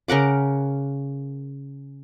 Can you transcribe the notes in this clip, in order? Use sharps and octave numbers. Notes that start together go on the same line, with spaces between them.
C#3 A#4 F#5 D6